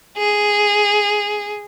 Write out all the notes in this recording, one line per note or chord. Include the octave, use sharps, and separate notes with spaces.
G#4